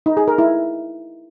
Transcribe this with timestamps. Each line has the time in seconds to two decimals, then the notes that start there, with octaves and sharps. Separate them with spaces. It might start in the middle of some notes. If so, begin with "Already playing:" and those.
0.06 D#4
0.17 G#4
0.28 A#4
0.38 E4